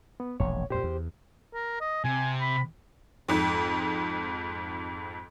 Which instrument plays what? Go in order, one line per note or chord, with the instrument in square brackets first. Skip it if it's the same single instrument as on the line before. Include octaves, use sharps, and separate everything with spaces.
[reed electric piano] B3
[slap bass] E1 A#1 [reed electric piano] C#5
[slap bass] F2 A#2 [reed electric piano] G4 C5
[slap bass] E2
[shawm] A#4
D#5
[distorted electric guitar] C3 [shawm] G#5
[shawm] B5
[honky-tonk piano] F2 G#2